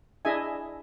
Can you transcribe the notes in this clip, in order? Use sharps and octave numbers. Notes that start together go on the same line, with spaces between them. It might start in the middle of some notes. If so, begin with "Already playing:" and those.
D4 E4 G#4 D#5 E5 G#5